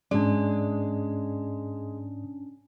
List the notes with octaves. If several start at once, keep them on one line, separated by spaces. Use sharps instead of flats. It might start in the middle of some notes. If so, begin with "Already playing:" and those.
G#2 G#3 C#4 D4 D5